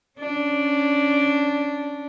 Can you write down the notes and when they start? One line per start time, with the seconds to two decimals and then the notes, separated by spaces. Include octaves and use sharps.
0.19 C#4 D4